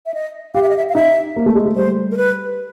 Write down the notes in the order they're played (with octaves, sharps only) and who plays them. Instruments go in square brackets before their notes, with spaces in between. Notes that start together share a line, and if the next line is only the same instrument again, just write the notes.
[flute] E5
D#5
[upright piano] G4 [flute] F5
[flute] E5
D#5
E5
F5
[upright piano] D#4 [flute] E5
[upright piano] A#3
A3
G#3
A3
[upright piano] G3 [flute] C5
[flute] A#4
B4